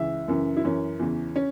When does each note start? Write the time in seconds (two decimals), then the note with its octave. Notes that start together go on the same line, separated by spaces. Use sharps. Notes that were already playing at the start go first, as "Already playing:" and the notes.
Already playing: C#2 E3 E5
0.28 F#2 C#3 E3
0.57 E4
0.64 F#2 E3 C#4
0.99 E2 C#3 E3
1.36 C#4